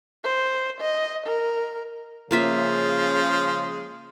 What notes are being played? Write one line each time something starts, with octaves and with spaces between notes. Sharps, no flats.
C5
D#5
A#4
C#3 F3 G#3 A#3 F4 E5